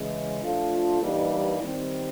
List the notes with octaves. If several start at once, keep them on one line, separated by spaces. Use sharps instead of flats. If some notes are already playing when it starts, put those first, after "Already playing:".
Already playing: C#3 E3 G#3
F3 A3 D4 F4 A4
G2 E3 G3 A#3 D#4
D#3 G3 C4